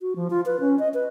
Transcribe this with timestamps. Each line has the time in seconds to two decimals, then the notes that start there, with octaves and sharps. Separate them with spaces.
0.01 F#4
0.16 F3
0.30 F4
0.46 B4
0.60 C#4
0.79 D#5
0.94 B4